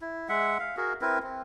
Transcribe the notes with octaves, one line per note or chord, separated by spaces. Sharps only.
E4
G#3 E5 F#5
F5
F#4 G#4 A#4
C4 E4 A#4 B4
C4